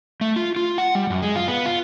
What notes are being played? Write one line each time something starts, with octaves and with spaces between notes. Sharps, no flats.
A3
F4
F4
F#5
G3
F#2
G#3
F4
B3
F4